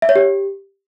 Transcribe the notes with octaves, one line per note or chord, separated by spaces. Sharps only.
E5
C#5
G4